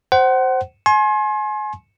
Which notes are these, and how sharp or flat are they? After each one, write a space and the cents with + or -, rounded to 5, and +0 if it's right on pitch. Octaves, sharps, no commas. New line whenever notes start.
C5 +0 F#5 +30
G#5 +30 C6 +35